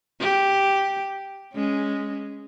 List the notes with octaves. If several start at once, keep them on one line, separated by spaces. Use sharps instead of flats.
G4
G#3 C#4